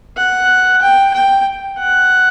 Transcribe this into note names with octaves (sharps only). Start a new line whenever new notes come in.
F#5
G5
G5
F#5